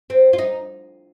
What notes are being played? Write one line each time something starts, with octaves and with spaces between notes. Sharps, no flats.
C4
F4
D#4